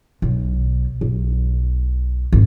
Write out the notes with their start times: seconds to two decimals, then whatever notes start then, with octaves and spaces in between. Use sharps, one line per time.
0.22 B1
1.01 B1
2.33 G#1